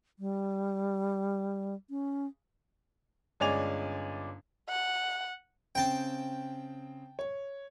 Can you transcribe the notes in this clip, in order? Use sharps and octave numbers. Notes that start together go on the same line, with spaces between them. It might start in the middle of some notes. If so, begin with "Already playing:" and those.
G3
C#4
G1 G#3 C#4 D5 G#5 F7
F#5
C#3 C4 G5 A5
C#5